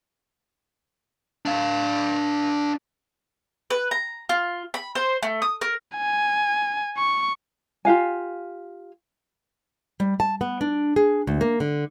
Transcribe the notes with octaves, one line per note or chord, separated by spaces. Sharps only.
D4 F5
B4
A#5
F4
B5
C5
A3
D#6
A#4
G#5
C#6
F4 G4 F5 G#5
G3
A5
B3
D4
G#4
D2
A#3
D3